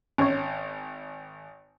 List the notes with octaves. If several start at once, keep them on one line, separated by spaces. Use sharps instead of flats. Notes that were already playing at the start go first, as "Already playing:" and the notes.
G#1 C#4 C#5